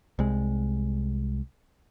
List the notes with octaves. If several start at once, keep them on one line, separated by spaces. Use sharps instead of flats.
C2 G#3